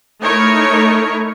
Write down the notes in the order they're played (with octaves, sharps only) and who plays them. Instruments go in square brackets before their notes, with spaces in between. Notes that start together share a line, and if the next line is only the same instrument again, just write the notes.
[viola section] A3 D#4 E4 A#4 C#5